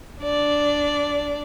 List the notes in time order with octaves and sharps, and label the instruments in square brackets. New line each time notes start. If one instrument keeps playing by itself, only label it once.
[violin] D4 D5